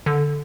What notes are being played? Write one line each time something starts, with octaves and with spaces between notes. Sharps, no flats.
D3